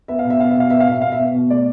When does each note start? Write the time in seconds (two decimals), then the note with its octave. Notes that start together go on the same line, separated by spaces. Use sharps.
0.08 B3 E5
0.19 F5
0.25 B2
0.30 E5
0.40 B3 F5
0.51 E5
0.56 B2 F5
0.70 B3 E5
0.80 F5
0.87 B2 E5
1.02 B2 F5
1.12 E5
1.19 B3
1.34 B2
1.50 A3 D5